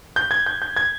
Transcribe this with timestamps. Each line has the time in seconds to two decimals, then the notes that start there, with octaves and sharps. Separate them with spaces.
0.16 G6
0.31 G#6
0.46 G6
0.62 G6
0.76 G#6